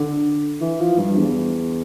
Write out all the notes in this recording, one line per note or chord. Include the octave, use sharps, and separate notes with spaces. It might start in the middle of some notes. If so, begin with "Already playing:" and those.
Already playing: D3
E3
F3
G2
E2